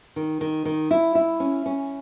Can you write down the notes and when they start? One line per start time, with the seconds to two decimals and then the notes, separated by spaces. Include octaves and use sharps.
0.16 D#3
0.41 D#3
0.65 D#3
0.91 E4
1.15 E4
1.40 C#4
1.66 C#4